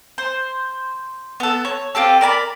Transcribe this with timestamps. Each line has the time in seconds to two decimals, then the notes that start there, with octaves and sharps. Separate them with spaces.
0.18 C5
1.40 B3 A4
1.65 C#5
1.95 C4 F4 G4 A4
2.21 A#4 D5 A5 B5